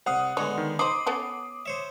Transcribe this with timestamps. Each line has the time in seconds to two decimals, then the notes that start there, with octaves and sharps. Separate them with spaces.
0.06 C2 F5 F#5 D#6
0.37 D3 G#3 B3 C#5
0.58 D#3
0.79 D#4 C5 B5 D6 D#6 C7
1.06 B3 C#4 A4
1.66 C5 C#5 E5